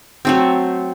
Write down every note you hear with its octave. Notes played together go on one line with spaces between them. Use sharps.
F#3 A3 C4